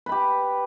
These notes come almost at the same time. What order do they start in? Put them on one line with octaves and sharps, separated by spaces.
B4 B5 G4